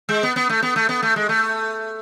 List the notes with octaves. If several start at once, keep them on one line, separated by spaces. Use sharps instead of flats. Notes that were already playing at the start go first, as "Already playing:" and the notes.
G#3
B3
B3
A3
B3
A3
B3
A3
G#3
A3